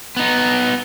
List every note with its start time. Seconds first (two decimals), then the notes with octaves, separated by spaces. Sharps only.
0.17 B3 D#4